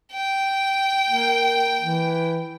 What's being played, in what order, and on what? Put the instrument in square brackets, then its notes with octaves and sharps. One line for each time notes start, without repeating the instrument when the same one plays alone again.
[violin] G5
[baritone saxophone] A#3
E3